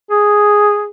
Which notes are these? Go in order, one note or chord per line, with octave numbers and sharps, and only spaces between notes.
G#4